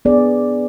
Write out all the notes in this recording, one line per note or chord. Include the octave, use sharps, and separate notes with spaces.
B3 D4 G#4 D5